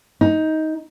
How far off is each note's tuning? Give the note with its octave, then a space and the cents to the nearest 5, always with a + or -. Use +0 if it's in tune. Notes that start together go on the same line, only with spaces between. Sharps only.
D#4 +15